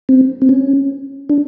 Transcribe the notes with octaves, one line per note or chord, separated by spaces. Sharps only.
C4
C4
C#4
D4